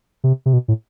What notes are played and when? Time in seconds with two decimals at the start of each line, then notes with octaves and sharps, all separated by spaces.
0.24 C3
0.46 C3
0.53 B2
0.68 A2